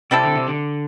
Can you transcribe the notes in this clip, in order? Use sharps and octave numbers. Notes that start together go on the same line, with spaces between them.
C3 G3 C4 E4 A4
D3
C3
D3